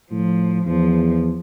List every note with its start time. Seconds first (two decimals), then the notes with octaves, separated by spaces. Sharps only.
0.11 A2 F3
0.66 E2 F3